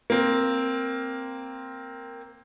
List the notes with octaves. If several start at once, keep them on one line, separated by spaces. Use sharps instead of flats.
A#3 C4